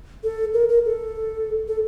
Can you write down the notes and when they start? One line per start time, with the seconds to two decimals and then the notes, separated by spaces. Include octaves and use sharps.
0.24 A4
0.54 A#4
0.69 A#4
0.85 A4
1.68 A4